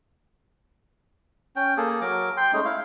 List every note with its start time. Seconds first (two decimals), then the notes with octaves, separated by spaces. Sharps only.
1.56 C#4 G5
1.77 A#3 G#4 A4
2.01 F#3 A#4 D6
2.37 G5 C6
2.53 G#3 A3 C#4 D#4
2.64 E4 F5